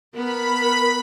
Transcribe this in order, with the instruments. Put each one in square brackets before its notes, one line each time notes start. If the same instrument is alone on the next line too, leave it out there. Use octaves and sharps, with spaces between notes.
[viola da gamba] B3 [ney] A#4 [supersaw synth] B5